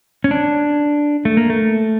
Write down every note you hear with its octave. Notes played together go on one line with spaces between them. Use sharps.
C#4
D4
A3
A#3
A3